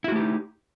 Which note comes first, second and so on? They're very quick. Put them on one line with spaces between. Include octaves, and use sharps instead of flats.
E4 F#4 A3 G4 D#4